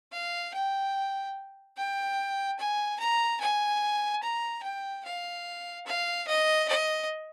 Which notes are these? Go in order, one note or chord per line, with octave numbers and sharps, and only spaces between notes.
F5
G5
G5
G#5
A#5
G#5
A#5
G5
F5
F5
D#5
D#5